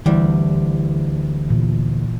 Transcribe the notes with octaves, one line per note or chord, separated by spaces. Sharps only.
D2 E3 G3
A#2 E3